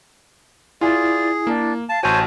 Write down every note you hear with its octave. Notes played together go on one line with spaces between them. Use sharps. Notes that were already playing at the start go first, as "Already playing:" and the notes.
E4 F4 G#4 D5
A#3 D4
F5 A5
A1 F#4 C5 C#5 G#5 A5